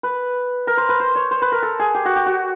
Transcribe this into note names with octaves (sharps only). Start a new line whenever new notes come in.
B4
A#4
C5
B4
C5
C#5
C5
B4
A#4
A4
G#4
G4
F#4
G4
F#4